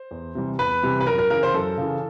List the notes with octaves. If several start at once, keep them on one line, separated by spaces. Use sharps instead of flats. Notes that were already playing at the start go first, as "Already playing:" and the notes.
Already playing: C5
E2
C3 E3 G3
E2 B4
C3 E3 G3
B4
F#2 A#4
A#4
C#3 E3 A#4
C5
F#2 A4
C#3 E3